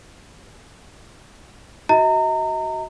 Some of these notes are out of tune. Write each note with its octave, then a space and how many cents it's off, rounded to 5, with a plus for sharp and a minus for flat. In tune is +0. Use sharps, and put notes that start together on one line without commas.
F#4 +15 D#5 +40 A#5 -30